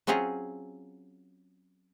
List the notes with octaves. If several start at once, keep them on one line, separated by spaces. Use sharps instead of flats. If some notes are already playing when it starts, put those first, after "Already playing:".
F#3 C4 C#4 F4 G#4 D#5